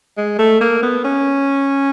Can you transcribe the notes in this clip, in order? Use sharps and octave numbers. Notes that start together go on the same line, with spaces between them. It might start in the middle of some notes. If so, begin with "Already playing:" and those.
G#3
A3
A#3
B3
C#4